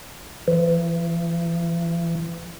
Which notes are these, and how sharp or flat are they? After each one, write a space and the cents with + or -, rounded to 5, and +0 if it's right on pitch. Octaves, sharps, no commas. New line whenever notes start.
E3 +40